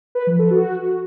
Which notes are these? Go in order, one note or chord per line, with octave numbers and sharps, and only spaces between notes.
B4
F3
A4
F#4